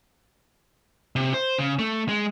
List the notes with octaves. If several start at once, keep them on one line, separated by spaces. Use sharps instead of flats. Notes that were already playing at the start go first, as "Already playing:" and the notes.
C3
C5
C#3
A3
G#3